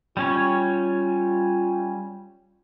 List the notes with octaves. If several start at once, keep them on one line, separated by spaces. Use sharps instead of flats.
G3 C#4 F4 C#5